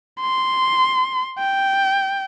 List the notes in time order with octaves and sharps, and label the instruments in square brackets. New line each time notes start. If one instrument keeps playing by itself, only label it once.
[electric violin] C6
G5